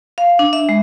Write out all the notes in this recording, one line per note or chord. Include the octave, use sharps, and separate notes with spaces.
F5
D4
E5
G#3